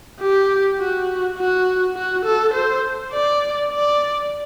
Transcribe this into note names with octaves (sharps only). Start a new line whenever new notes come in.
G4
F#4
F#4
F#4
A4
C5
D5
D5